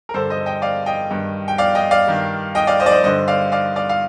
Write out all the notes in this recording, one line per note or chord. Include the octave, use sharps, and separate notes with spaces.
A#4
G2 D3 A4 C5
C5 D#5
D#5 G5
D5 F5
D#5 G5
G2 D#3
G5
D5 F5
D#5 G5
D5 F5
G2 D#3
D#5 G5
D5 F5
C5 D#5
D5
C5 D#5
G2 D3 C5 D#5
D5 F5
D5 F5
D5 F5
F5